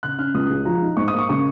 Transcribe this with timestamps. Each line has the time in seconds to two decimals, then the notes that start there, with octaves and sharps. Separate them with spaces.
0.03 C#3 F#6
0.18 C#4 F6
0.34 C#2 D#6
0.50 G#3
0.65 F3 A#5
0.82 D#4
0.97 G#2 C#6
1.08 A#3 D#6
1.18 C#6
1.29 C#3 C#6